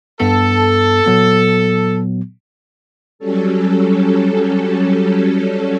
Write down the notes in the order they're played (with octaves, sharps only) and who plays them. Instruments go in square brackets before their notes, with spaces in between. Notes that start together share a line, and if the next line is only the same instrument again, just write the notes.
[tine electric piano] G2 B3 [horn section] A4
[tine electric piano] A#2 F#3 B3
[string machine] F#3 G3 C#4 A4